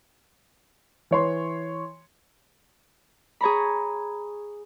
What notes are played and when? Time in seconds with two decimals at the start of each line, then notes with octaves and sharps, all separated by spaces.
1.11 E3 C#5 C6
3.41 G#4 C#5 A#5 B5